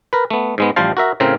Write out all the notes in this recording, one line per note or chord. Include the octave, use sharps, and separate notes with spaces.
A#4 B4
A3 B3
G#2 G#3 B3
A1 F3 G3 C5 F5 A5
F#4 A#4 E5
A2 C#3 C4 A#4 F5